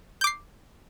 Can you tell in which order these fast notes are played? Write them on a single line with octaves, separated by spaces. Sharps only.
G6 D6 C7